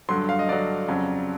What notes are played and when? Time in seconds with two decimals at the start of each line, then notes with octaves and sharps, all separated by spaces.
0.09 G2 D3 F#3 C6
0.29 F5
0.39 D#5
0.49 G2 D3 F#3 D5
0.88 F2 C#3 F#3